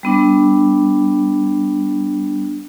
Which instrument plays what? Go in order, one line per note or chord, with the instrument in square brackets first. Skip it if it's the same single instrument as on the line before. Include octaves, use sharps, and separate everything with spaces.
[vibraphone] G3 B3 D4